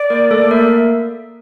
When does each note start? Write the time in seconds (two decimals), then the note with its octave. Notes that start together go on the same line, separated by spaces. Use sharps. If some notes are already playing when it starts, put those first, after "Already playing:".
Already playing: D5
0.10 A#3 A#4
0.31 A3 A4
0.51 A#3 A#4 E5